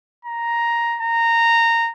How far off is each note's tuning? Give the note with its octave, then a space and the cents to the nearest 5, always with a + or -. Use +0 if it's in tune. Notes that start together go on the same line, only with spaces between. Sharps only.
A#5 +5
A#5 -15